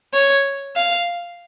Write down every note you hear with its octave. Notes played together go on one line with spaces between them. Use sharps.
C#5
F5